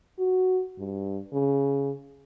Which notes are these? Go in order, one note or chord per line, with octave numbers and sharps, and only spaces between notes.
F#4
G2
C#3